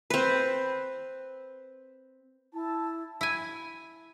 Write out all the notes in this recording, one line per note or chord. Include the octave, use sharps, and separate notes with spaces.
C4 B4
E4 A5
E4 G#5